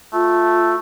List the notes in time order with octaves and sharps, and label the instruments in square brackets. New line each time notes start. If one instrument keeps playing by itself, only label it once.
[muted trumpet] A3 [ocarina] F4